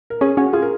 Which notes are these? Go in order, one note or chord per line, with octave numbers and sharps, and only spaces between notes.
A#4
C#4 G#4
C#4 F#4
F4 G#4
A#4